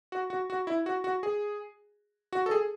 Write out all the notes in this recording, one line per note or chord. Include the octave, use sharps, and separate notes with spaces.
F#4
F#4
F#4
E4
F#4
F#4
G#4
F#4
A4
G#4